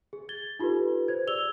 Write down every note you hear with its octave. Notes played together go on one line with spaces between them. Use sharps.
G#4
G#6 A6 G7
D#4 F4 G4 A4 B4
C5 G#6
G#4 D5 E6 F7 G7